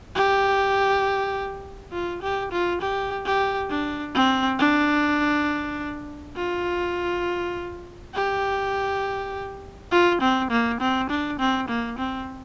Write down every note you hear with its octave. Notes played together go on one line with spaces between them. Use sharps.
G4
F4
G4
F4
G4
G4
D4
C4
D4
F4
G4
F4
C4
A#3
C4
D4
C4
A#3
C4